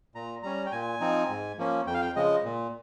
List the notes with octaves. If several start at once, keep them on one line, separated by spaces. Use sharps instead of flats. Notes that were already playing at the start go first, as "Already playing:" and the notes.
A#2 A#5
G3 C#4 A#5
G5
A#2 G#5
F3 C4 D#4
G#2
F3 A#3 C#4
F2 G5
F5
G5
C#3 F3 G#3 D#5
A#2